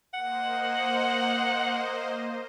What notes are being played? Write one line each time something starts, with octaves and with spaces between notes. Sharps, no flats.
A#3 C5 D#5 F#5